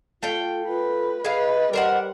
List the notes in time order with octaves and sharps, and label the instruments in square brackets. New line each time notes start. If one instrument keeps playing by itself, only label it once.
[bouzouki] A3 F5 G5 [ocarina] F4
[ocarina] F4 [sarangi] B4
[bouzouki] G#4 F5 [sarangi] B4 [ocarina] D#5
[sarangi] G3 [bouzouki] A#4 C5 F#5